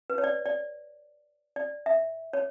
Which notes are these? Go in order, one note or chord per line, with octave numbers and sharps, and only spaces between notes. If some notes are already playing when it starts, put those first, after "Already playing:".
B4
C#5
D5
D5
D5
E5
C#5